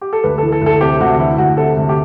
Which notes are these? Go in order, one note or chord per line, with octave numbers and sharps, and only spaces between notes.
G4
A4
D2 B4
E3 A4
A4
D2
A4
C3 G4
D2 F#4
E3 E4
D2 F#4
C3 A4
D2
G4